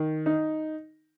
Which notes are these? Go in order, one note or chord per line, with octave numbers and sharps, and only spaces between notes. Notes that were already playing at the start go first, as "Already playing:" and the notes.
Already playing: D#3
D#4